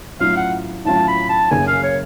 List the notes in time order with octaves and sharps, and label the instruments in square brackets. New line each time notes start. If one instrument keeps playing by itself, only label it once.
[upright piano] A2 F#3 C#4 F4 [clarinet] F5
[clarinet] F#5
[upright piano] A2 F#3 C#4 F4 [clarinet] A5
[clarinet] B5
A5
[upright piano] F#1 F#2 C#3 [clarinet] G#5
[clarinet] F5
C#5